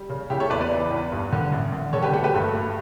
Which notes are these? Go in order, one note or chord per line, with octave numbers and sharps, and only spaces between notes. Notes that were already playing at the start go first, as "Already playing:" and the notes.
Already playing: G3
C#3
C#3 E4 G4
A4 C#5
E2 B4 D5
B4 D5
E3
E2
G2
D3
A1
D3
D3 A4 C#5
G4 B4
A3 F#4 A4
G4 B4
G2 F#4 A4
A3